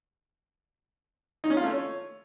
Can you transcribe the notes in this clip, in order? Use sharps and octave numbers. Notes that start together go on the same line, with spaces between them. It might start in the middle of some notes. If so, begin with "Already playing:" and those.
D#4
C#4
F4
A3
C#5